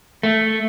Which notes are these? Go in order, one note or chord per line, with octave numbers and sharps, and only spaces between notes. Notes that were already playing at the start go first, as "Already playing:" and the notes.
A3